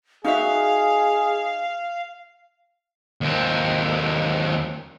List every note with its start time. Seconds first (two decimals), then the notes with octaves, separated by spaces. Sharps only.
0.24 D#4 F#4 G#4 E5 F5
3.21 D#2 C4